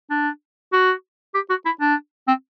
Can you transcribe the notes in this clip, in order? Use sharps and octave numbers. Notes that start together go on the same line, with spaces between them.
D4
F#4
G4
F#4
E4
D4
C4